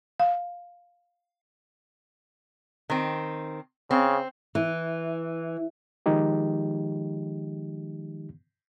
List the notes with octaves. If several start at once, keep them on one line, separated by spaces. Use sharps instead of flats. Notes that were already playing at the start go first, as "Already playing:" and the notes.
F5
D#3 C4
C#3 C4
E3
D#3 F3 G#3 D#4 G4